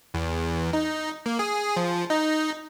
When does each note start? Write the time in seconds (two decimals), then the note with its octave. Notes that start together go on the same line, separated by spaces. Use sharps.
0.14 E2
0.73 D#4
1.26 A#3
1.39 G#4
1.77 F3
2.10 D#4